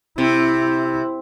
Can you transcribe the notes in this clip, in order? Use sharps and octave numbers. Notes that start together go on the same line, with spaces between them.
C3 E4